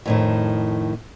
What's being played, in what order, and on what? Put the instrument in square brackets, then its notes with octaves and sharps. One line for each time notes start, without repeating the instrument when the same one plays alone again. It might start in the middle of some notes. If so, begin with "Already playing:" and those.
[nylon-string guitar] F2 A2 D#3